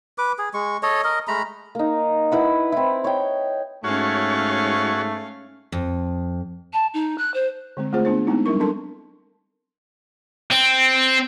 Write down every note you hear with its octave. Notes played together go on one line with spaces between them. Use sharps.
B4 D6
G#4
G#3 C#6
A4 C#5 D#5
A#4 D#5
G#3 A3 A#5 B5
A#3 D#4
E4 B4 F#5
C4 E4
C#5 D#5 G5
G#2 A3 C#4 F#4 C#5 F5
F2
A5
D#4
F#6
C5
D3 G#3 C4
A3 C4 F4 G#4 C5
B3 D4 C5
G#3 B3 C4 D#4 E4
F#3 G3 D4 E4 A#4 C#6
C4 D4 A4 A#4 A5 C6
C4